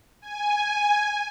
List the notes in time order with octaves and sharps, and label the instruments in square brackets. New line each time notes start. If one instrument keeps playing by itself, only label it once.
[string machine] G#5